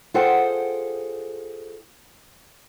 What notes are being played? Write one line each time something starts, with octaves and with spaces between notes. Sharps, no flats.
F4 G#4 A4 C5 F#5 G5